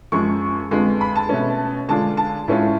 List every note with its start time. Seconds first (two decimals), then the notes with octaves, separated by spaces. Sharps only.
0.12 F#2 F3 G#3 C#6
0.71 F2 D3 G#3 B3 F4
1.01 B5
1.16 A5
1.29 B2 A3 C#4
1.89 D3 G#3 D4 F4 A5
2.17 A5
2.48 A2 G#3 C#4 F4